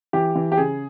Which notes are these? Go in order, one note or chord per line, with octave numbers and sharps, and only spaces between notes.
E3 G4
E3
G4
C#3 G#4